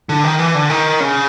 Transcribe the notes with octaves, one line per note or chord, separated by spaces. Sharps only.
D3
D#3
E3
D3
D#3
C#3